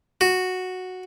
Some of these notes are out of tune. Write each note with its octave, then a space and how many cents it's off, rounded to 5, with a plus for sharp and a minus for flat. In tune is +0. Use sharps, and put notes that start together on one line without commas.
F#4 -5